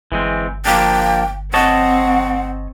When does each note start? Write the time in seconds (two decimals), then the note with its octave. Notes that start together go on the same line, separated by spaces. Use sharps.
0.12 G1 E3 G#3 C4
0.65 F3 A#3 D4 G5
1.54 C4 C#5 D#5 F#5 A5